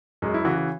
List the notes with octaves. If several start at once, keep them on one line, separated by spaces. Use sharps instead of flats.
F#2 G#3
E4
C#3 E3 F#4
F#4